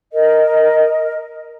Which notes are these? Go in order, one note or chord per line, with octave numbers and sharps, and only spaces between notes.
A#4 D#5